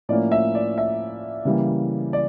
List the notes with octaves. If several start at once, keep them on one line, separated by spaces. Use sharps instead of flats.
A2 F3 A#3 C#4 D5
E5
D5
E5
C#3 E3 G3 A#3
D5